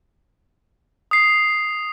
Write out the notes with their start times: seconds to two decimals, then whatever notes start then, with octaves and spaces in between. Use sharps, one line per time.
1.11 D#6 C7